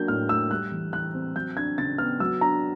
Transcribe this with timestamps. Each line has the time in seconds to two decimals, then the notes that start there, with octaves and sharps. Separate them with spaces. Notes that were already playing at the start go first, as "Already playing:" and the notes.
Already playing: F#3 A#3 D4 G6
0.08 A2 F6
0.29 A3 E6
0.51 G3 F#6
0.72 E3
0.93 E3 F#6
1.14 C4
1.35 F#3 G6
1.56 D4 G#6
1.78 C#3 A6
1.98 B3 F6
2.20 F#3 E6
2.41 D4 A#5